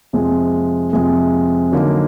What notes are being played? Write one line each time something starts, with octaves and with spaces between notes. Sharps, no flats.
F2 C3 F3 G#3
F2 C3 F3 G#3
D3 F#3 A#3 D#4